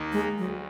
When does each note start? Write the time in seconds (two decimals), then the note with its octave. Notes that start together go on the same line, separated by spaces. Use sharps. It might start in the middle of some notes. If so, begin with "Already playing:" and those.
Already playing: D#2 D#3 A#3 D#4
0.13 G#3
0.38 D2 F#3